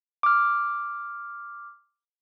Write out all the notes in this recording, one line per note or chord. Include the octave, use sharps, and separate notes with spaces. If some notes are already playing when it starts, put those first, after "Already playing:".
D6 F6